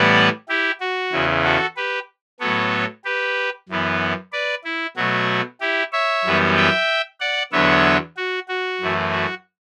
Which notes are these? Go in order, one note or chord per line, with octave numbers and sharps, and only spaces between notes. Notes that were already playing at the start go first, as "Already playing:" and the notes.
Already playing: A2 E3 G3 B3 D5 F#5
E4 G4
F#4
E2 C#3 E3
F#4 A4
G4 B4
A2 F#3 B3 A4 C#5
G4 B4
F#2 E3 B3
B4 D5
E4
B2 F#3 A3 F#4
E4 G4
C#5 E5
F#2 E3 G3 B3
E5 G5
D5 F#5
E2 D3 F#3 B3 C#5 E5
F#4
F#4
F#2 E3 A3
F#4